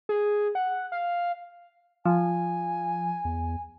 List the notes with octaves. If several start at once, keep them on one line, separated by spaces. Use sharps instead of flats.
G#4
F#5
F5
F3 G#5
E2